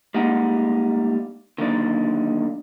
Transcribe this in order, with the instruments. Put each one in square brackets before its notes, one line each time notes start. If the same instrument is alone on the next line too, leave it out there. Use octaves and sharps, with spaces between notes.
[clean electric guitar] G3 G#3 A#3 D#4 F#5
D3 D#3 F#3 A#3 D#4 D5